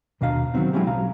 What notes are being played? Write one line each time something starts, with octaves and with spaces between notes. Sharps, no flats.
D#2 B2 D4 D#5 F5 A#5
D#3 F3 F#3 B3 C4 D#4
F#3 G#3 C4 C#4 E4 G4
B1 F5 A#5